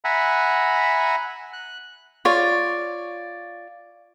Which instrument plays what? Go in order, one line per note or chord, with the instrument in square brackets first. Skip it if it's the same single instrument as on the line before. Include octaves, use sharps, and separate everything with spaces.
[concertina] E5 F#5 G#5 A#5 B5
F#6
[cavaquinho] F4 C#5 D5